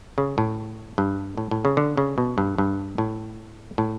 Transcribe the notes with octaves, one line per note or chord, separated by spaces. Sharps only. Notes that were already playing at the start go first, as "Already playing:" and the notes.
C#3
A2
G2
A2
A2
C#3
D3
C#3
B2
G2
G2
A2
A2